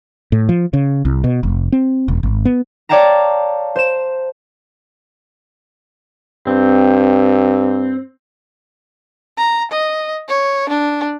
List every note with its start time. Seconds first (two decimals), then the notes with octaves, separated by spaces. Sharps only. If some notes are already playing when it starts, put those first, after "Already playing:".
0.32 A2
0.49 F3
0.73 C#3
1.05 C2
1.24 B2
1.43 F1
1.72 C4
2.08 E1
2.23 G#1
2.45 B3
2.89 C#5 D5 F5 G5 A5 A#5
3.76 C5 E7
6.47 G2 C4
9.37 A#5
9.72 D#5
10.29 C#5
10.69 D4